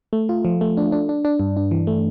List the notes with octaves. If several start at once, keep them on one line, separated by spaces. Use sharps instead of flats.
A3
F4
F3
A3
D4
D4
D4
D4
G2
D4
E3
A3